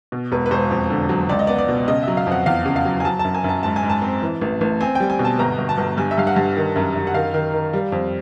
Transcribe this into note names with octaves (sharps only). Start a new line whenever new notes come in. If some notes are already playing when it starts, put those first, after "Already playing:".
B2
E1 B4
B4
E1 C5
F2
D3
F#3
C#2 D5
D#5
B3 D5
D5
B2
C#3 D#5
F#3 E5
F5
F2
F#5
E2 F5
C#3
F5
F#3
G#5
F#3 A5
A5
F#2
G#5
F#2 A5
G#2 A5
G#5
G#2
A5
C4
E3
A1
A1
C4 G#5
G3 G5
G#5
B2
A5
G1 A#5
G1
A5
G1
G2 G#5
E5
G2 F5
F#5
G2
D#3
F#2
F#2
F#5
D#3 F5
D#3
D#3
G3
F2